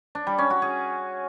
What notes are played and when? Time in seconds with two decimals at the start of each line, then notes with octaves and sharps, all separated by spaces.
0.15 D4
0.27 G3
0.38 C#4
0.50 F#4
0.62 G#4